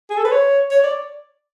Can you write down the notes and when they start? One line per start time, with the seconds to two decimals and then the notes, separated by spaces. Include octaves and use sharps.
0.10 G#4
0.18 A4
0.25 B4
0.32 C#5
0.71 C#5
0.84 D5